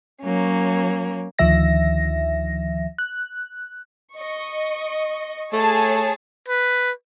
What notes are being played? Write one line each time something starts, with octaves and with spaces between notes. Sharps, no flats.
F#3 A#3 C#4
D2 D#3 F3 E5 A#6
F#6
D#5 C#6
A3 G#4 C#5 A5
B4